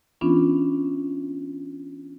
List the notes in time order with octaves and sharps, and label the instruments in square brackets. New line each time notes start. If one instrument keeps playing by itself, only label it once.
[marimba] E3 B3 C#4 D4 F4